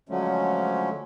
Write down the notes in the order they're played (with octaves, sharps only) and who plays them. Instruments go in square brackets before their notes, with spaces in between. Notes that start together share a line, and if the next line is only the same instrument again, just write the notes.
[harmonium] D3 F3 F#3 G#3 A3 C#4